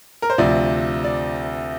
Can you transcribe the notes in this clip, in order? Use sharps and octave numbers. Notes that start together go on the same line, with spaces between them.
A#4
C5
D2 C3 F3 D5
D5